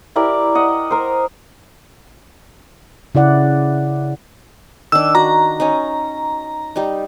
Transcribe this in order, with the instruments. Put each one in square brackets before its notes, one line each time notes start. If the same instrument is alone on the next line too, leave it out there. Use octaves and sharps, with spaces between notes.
[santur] E4 G4 A#4 D5
D#5 F#5
A#4 C5
[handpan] C#3 E4 D5 F#5
[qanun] D#3 D4 [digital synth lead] E6
[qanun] F#4 [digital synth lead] A#5
[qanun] C#4 D#4
G3 D#4